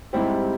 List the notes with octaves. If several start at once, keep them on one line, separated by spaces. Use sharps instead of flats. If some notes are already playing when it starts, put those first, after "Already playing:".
G#2 G3 C4 E4 G4